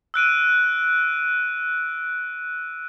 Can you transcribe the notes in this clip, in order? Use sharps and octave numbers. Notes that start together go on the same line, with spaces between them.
E6 F#6 D7 D#7